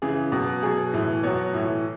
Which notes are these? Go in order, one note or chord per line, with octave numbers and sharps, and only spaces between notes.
C#3 E3 G#4
B2 F#3
B2 F#3 G#4
A2 E3
B2 F#3 C#5
A2 E3